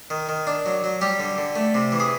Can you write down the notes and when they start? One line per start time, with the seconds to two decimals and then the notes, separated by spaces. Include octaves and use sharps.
0.10 D#3
0.29 D#3
0.47 D4
0.66 F#3
0.84 F#3
1.01 G3 G4
1.20 D3
1.38 D3
1.56 A3
1.74 C3
1.92 E3
2.00 G#4